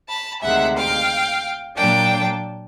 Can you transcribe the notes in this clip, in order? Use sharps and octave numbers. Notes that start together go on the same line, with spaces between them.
A5 B5
D2 C3 D#3 G#3 E5 F#5
F5 G5
A#2 F#3 A#3 D4 G5 A5